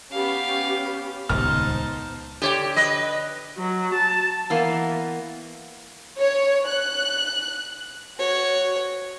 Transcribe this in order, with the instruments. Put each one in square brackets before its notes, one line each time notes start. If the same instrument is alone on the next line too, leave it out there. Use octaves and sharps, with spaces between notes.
[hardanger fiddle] B3 F5 [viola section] C#4 G4
[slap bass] D#1 C#2 [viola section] B3 C5 [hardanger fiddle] D#4 A5 [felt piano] F6
[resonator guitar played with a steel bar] D3 C#5 G5 [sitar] G4
[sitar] B4 D#5
[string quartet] F#3
A5
[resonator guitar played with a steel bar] E3 A#3 B3
[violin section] C#5
F#6
[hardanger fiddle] F#4 C#5